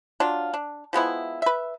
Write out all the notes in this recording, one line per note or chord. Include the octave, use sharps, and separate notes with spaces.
F#3 D4 F4
D4
F3 G#3 B3 E4
B4 E5